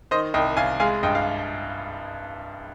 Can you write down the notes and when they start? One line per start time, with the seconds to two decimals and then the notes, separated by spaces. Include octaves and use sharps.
0.11 D#3 C5 D#5
0.34 C2 D#5 G5
0.57 C2 F5 G#5
0.80 G#3 F5 G#5
1.03 G2 D#5 G5
1.15 F5